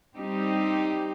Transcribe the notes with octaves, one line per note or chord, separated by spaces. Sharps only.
G3 C4 D#4 G4